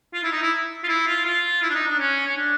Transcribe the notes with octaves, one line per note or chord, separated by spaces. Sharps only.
F4
E4
D#4
E4
F4
E4
F4
F4
E4
D4
D#4
D4
C#4
C#4
D4